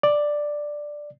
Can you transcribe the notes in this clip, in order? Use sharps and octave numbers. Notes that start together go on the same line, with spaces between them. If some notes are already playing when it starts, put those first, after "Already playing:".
D5